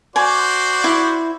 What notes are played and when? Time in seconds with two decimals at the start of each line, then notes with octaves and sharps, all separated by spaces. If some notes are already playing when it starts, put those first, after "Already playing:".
0.16 F#4 C5 D5 G#5
0.84 E4